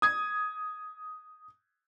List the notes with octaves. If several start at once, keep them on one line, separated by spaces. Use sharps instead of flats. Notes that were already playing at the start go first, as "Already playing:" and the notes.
D#6 G#6